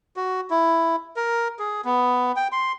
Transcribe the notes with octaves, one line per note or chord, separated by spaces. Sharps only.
F#4
E4
A#4
G#4
B3
G5
C6